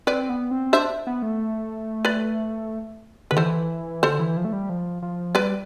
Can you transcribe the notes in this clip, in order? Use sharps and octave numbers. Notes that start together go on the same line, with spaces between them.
C4 B4 D5
B3
C4
D4 C5 E5
B3
A3
B4 D5
D3 B4
E3 A4 C5
D3 A4 C5
E3
F3
A3
G3
F3
F3
G3 B4 D5